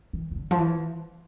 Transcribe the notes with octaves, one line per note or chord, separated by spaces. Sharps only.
E3
E3
D3
F3
E3